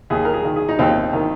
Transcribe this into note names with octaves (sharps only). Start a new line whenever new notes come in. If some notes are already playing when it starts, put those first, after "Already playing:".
D#2 G#4
A#4
G#4
D#3
G#4
D#4
D#2 C4
D#3